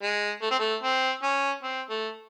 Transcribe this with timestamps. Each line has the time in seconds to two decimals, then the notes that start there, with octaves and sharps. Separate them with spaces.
0.02 G#3
0.42 A3
0.51 C4
0.59 A3
0.83 C4
1.23 C#4
1.63 C4
1.90 A3